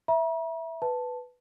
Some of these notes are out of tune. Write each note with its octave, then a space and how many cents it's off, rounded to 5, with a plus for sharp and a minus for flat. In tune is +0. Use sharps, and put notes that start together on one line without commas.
E5 +0 A#5 +45
B4 +5 A5 +0